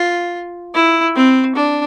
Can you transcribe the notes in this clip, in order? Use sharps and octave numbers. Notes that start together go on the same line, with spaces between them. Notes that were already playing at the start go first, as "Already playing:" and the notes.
Already playing: F4
E4
C4
D4